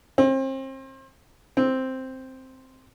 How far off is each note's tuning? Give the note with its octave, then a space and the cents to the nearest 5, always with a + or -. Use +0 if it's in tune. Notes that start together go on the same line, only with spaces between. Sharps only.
C4 +35
C4 +0